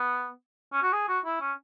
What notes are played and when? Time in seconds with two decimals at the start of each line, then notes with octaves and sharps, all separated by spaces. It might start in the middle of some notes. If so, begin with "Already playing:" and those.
Already playing: B3
0.73 C#4
0.82 F#4
0.93 G#4
1.08 F#4
1.25 E4
1.41 C#4